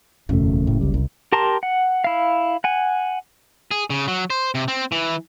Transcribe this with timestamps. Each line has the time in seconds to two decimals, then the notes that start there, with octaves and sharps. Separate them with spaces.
0.29 F#1 E2 B2 A3
0.67 A2
0.81 C#2 G3
0.94 C2
1.32 G4 A#4 A5 A#5 C6
1.63 F#5
2.04 E4 F5
2.64 F#5 G#5
3.71 G#4
3.90 C#3
4.08 F#3
4.30 C5
4.55 C3
4.68 C4
4.92 E3